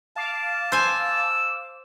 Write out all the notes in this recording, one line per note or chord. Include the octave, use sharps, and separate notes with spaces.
F5 A5 D6
C5 G#5 E6